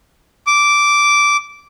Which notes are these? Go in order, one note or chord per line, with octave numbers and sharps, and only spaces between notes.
D6